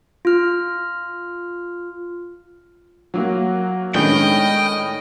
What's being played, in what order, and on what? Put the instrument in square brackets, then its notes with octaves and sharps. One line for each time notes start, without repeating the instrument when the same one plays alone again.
[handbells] F4 F6
[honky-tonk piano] F#3 A#3 F#4
[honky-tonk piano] A2 D#3 C#4 [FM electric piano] G#3 B3 D4 [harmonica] D#5 [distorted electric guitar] G5